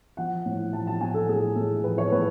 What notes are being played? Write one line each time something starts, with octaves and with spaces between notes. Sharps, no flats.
F3 F#5
A2
F3 A5
A5
A2 G#5
A4
A2 G#4
A2
F3 B4
C#5
A2 B4